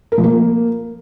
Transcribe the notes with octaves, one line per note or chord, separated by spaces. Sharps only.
A#4
F3
A#3